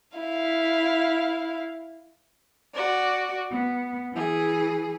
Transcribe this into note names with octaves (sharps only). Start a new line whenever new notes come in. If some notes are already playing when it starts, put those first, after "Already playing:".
E4 F5
F#4 D5
B3
E3 G#4